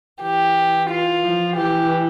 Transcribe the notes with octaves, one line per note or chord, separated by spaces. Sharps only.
E3 G4
F4
F3
E3 G4